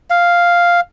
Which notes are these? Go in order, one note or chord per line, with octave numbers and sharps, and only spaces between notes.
F5